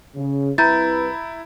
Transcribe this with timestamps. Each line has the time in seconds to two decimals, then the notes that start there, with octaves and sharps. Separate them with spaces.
0.16 C#3
0.58 C2 E4 B4 A#5 G6 A6